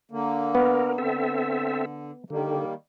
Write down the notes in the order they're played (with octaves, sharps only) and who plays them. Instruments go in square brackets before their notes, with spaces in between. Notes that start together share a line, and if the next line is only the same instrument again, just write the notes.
[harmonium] D3 A#3
[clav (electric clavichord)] B3 [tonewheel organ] A#4
[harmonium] D3 [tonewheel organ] C4 A4 E5
[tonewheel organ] D3 [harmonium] D#3 G3 A#3